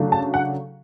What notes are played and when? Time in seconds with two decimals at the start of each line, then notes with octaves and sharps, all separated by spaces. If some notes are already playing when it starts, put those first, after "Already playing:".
Already playing: C#3 F#3 A3 D4
0.12 A5
0.34 F#5